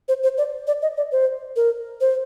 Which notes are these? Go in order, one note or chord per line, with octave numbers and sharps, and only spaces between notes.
C5
C5
D5
D5
D#5
D5
C5
A#4
C5